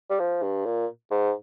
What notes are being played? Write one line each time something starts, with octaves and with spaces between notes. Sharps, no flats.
G3
F3
G2
A#2
G#2